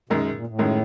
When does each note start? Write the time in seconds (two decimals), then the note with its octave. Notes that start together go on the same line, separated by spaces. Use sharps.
0.09 F#2 B2 D#3 G#3
0.27 B2
0.34 A#2
0.47 A2
0.59 F#2 D#3 G#3